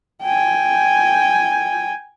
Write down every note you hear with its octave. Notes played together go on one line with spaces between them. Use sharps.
G5 G#5